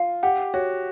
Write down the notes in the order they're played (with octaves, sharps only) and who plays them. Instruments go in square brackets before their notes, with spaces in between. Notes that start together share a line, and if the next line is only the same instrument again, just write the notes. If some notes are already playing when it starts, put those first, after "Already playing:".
Already playing: [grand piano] F4 [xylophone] F5
[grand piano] G4 [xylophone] F#5
[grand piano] F#4 [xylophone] C#5